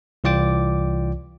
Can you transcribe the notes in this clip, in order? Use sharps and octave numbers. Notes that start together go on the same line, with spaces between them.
C2 E3 F4 D5 G5 D6